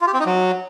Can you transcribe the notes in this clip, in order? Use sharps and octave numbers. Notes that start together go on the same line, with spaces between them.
F4
G4
C4
D#4
F#3